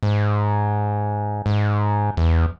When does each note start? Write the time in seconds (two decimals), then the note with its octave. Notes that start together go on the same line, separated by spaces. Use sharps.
0.03 G#2
1.46 G#2
2.17 E2